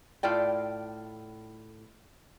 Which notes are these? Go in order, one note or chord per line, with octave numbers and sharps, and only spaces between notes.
A2 F4 D5 G5